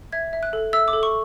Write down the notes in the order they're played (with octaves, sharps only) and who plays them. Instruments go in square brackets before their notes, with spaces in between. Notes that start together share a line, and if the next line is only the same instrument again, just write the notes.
[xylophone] E5 G#6
E5
F#6
A4
E5 E6
D6
A4
C#6